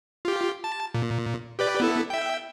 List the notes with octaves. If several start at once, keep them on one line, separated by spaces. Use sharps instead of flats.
F4 G4
A5
A#2
G4 B4 D5
B3 E4 A4
E5 G5